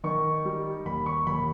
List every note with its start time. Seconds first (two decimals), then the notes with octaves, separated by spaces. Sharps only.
0.04 D#3 C#6
0.45 G3
0.85 D#2 B5
1.06 C#6
1.27 D#2 B5